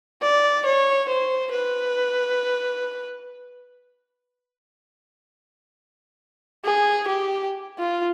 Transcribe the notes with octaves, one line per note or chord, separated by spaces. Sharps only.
D5
C#5
C5
B4
G#4
G4
F4